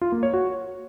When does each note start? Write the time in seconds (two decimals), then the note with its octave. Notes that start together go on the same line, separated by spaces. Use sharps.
0.01 F4
0.12 A#3
0.23 C#5
0.33 F#4